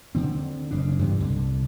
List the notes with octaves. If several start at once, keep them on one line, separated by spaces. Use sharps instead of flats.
D3 C4
F#1 C#3 D4
G2 C3 E3
C2 D3